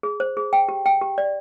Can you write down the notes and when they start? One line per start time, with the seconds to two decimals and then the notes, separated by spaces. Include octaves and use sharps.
0.03 G#4
0.20 C5
0.37 G#4
0.53 G5
0.69 G4
0.86 G5
1.01 G4
1.18 D5